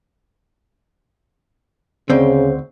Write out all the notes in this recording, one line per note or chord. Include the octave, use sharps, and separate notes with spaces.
D2 C#3 C4